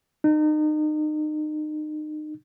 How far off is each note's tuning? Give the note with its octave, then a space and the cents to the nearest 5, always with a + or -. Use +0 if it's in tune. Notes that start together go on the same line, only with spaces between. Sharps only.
D#4 -30